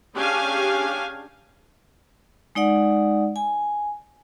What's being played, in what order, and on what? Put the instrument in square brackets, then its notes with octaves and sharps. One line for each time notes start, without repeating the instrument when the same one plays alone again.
[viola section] C#4 D4 G4 G#4 F5 G#5
[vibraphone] G#3 D#4 D5 F#5
G#5